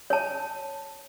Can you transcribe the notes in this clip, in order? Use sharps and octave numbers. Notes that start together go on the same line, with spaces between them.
C#5 A5